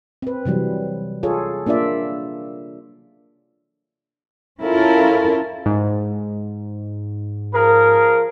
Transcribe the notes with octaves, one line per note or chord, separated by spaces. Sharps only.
C4 B4
C3 E3 F#3 G3
F4 G#4 A4 C#5
A#3 D4 F4 D5 E5
C#4 E4 F4 A4 A#4
G#2
F3 G#4 A#4